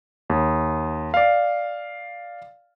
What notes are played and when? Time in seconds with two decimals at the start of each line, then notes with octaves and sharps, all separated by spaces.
0.30 D#2
1.14 D5 F5